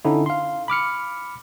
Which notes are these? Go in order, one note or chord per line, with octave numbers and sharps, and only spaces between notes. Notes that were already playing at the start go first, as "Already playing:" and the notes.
D3 C#4 D#4 E4
F5 C6
B5 D6 F6 C#7